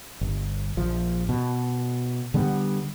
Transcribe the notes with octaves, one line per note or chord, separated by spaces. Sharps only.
G1
A#1 F3
B2
D3 G3 B3